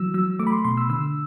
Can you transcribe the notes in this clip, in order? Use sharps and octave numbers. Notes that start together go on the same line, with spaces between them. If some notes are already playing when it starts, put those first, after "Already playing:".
Already playing: E3 F#3 E6
F#3 E6
A3 D6
B5
C6
B2 C6
E6
D3 E6